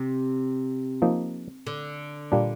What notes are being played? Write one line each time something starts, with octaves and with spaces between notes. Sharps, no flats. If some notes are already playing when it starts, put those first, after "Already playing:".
Already playing: C3
F3 A#3 D#4
D3
A#2 G3 A#3 D4